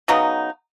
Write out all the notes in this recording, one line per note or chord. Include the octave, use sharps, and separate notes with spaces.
C#3 F#3 B3 D#4